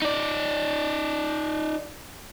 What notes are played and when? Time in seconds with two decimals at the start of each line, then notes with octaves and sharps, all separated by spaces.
0.02 D#4 D5